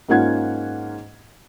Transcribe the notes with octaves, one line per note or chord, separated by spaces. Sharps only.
G#2 A#3 C#4 F4 F#5 G#6